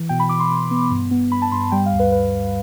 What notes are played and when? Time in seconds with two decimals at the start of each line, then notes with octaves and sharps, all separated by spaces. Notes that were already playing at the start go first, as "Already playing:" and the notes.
Already playing: E3
0.09 B2 G5
0.20 B5
0.29 B2 D6
0.40 C6
0.51 B2
0.71 B3
0.91 G2
1.11 B3
1.31 G2 B5
1.42 A5
1.52 G2 C6
1.72 G3 G5
1.86 F5
1.93 D2
2.00 B4
2.12 B4